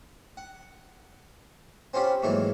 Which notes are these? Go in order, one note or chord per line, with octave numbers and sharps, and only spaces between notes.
F#5
C4 C#4 F4 G4 F#5 B5
G#2 E3 F#3 A3 A#3